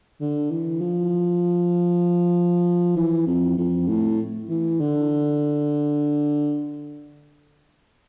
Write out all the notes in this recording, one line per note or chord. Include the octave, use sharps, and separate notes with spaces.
D3
E3
F3
E3
F2
F2
A2
E3
D3